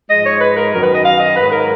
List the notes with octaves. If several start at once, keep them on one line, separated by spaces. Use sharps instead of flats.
G#2 F3 G#3 D#5
C#5
B4
A#4
F#2 D#3 F#3 A#4
B4
D#5
F5
D#5
G#2 D#3 F#3 B4
A#4